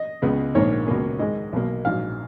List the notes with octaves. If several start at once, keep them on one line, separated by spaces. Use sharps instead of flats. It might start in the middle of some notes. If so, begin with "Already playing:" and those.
Already playing: D#5
C#2 C#3 G#3 B3
A#1 G#2 D#3 A#3 C#5
C#2 B2 A#3 C#4
G#2 D#3 G#3 D#5
B1 B2 A#3
A#1 G#2 F#3 F5